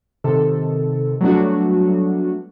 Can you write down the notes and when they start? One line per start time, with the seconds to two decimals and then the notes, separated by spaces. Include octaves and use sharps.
0.24 C3 D#3 A4
1.21 F#3 G3 A3 B3 D4 F#4